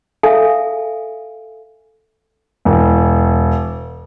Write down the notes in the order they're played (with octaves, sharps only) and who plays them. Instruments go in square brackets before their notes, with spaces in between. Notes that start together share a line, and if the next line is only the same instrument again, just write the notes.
[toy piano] A4 E5 F5 G#5
[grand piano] E1